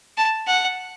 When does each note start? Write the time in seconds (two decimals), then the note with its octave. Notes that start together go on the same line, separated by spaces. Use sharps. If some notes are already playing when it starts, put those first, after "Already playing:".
0.17 A5
0.47 F#5